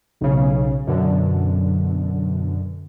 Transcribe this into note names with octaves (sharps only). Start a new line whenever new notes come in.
B1 C#3
F#2 B2 D3